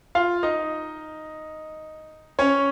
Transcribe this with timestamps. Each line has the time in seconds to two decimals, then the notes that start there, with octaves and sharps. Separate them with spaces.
0.15 F4 F5
0.43 D#4 D#5
2.39 C#4 C#5